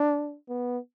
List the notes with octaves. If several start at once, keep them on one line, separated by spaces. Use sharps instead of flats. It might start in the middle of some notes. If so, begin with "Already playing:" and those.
Already playing: D4
B3